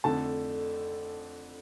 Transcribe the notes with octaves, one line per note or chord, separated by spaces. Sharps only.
F2 D3 A3 A5